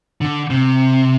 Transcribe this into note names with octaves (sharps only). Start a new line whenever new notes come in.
D3
C3